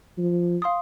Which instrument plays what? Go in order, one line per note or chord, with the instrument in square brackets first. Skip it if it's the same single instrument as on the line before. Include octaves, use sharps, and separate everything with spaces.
[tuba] F3
[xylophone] F5 C6 D#6